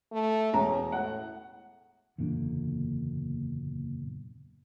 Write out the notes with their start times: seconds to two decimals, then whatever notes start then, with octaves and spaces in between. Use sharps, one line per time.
0.12 A3
0.53 E1 C#4 A#5
0.92 A2 F#5
2.18 F#1 E2 A#2 D3